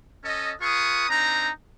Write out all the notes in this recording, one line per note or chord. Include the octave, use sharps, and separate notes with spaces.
C#4 A4 D#5
F4 G#4 B4 C#6 D#6
C4 D4 D#4 A#5